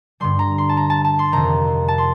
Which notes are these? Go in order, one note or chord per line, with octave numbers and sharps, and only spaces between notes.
G2 D3 G3 C6
A#5
C6
A5
A#5
A5
A5
C6
F2 C3 D#3 A#5
A5
C6